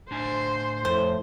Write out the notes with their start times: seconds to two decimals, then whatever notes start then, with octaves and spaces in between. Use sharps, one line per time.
0.11 A2 D4 C5 G#5
0.85 F2 A2 C5